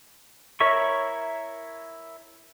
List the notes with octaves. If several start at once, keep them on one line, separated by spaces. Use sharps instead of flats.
E4 A#4 C#5 E5 C#6